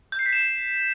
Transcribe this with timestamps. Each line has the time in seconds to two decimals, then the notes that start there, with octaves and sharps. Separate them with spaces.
0.12 G6
0.19 C7
0.26 B6
0.33 E7